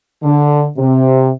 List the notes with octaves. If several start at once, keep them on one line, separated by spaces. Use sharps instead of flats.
D3
C3